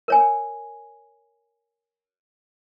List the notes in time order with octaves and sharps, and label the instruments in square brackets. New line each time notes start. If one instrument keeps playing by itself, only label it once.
[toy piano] A#4 C#5 G#5